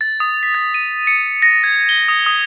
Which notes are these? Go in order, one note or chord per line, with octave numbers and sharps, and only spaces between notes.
A6
D#6
B6
A6
D#7
C#7
A#6
G#6
G7
D#6
D#6